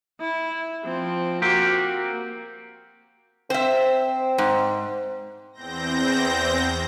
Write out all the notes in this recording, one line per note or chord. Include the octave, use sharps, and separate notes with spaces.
E4
F3 C4
A#3 C4 F#4 G4
C4 C5 E5
G#2
E2 C4 G6 A#6